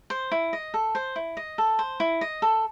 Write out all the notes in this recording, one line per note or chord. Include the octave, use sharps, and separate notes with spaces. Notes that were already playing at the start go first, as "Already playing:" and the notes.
C5
E4
D#5
A4
C5
E4
D#5
A4
C5
E4
D#5
A4